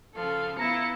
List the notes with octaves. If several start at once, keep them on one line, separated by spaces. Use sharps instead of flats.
C#3 F3 A4 F5
B3 E4 F4 A#5 A#6 C#7